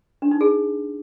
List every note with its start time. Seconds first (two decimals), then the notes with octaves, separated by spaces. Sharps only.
0.22 D4
0.31 D#4
0.41 G#4